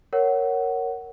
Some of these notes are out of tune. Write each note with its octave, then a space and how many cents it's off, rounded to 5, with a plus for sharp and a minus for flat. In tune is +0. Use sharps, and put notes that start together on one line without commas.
A#4 +0 C#5 +0 F#5 +15